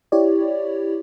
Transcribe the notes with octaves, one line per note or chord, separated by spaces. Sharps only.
E4 G4 C#5 D5